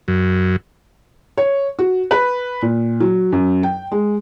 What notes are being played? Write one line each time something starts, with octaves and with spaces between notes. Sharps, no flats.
F#2
C#5
F#4
B4
A#2
F#3
F#2
G5
G#3